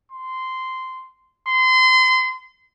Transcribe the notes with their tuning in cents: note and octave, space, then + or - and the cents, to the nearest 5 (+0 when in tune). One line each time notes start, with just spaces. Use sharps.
C6 -10
C6 -30